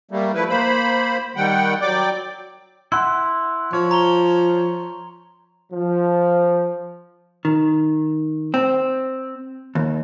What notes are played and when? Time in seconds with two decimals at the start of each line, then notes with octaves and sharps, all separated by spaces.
0.11 G3 A3 A#3
0.34 F3 A3 E4 B4
0.49 A#3 C5 B5
1.36 D#3 G3 F#5 G5
1.82 F#3 D5 G5 D6
2.92 E4 F#5 C6
3.73 F3 C#5
3.91 A#5 F7 G7
5.72 F3
7.45 D#3
8.54 C4
9.75 D#2